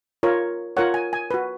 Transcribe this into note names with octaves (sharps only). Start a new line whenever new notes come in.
F4 A#4 C#5
F4 A#4 C#5 F#5
G#5
G#5
F#4 B4